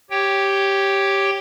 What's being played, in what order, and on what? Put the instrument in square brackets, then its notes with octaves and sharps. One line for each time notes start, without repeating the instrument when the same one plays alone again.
[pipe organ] G4 C#5 G5